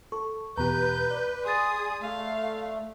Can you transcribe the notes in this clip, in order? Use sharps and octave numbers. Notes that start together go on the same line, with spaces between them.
A4 C#6
E2 B2 G4 B4 A#5 G6
D5
G#4 C6 D#6 A6
A3 F5